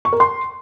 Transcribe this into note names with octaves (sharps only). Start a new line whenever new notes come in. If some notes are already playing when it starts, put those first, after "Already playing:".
C#6
A#4
C6